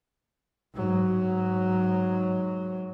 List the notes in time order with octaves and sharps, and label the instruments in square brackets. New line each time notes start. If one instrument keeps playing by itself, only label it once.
[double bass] G#2 F#3